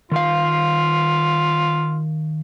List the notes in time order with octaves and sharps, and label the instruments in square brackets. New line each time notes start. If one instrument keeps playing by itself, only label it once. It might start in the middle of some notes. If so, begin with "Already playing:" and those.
[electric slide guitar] D#3 F5 [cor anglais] F4